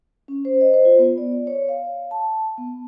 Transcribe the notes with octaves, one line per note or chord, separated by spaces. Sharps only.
C#4
C5
D#5
C5
F4
B3
D5
C#5
F5
A5
B3